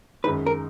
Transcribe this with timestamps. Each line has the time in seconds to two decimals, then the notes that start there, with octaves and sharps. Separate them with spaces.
0.24 F#2 D#3 G#3 D#4 B4
0.46 A#4